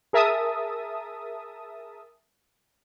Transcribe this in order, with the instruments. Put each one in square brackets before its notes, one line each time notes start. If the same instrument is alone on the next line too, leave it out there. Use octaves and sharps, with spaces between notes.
[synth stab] G#4 A#4 E5 A5 D#6